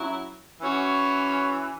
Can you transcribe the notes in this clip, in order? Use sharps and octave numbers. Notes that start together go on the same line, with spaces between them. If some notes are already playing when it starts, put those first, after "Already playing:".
Already playing: F#3 C#4 E4
E3 C#4 F#4